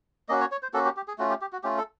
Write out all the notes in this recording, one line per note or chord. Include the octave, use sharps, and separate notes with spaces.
A#3 C#4 F#4 D#5
C#5
C#5
C5
A#3 C#4 F#4 A4
G4
G4
G#4
A3 C#4 F4 F#4
G4
G4
F#4
A3 C#4 F4 G4
A4